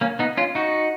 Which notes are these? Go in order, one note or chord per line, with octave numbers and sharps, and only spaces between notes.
A#3 C#4
B3 D#4
C#4 F4
D#4 F#4